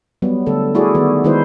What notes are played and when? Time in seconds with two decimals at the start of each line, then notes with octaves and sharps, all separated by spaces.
0.22 F#3 G3 B3
0.46 D3 A3 A4
0.75 A3 E4 F#4 G#4 D5
0.95 D#3 B3
1.24 D#3 G#3 D#4 E4 B4 C5